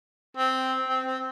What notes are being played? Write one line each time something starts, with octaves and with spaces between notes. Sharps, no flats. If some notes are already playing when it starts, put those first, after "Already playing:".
C4
C4
C4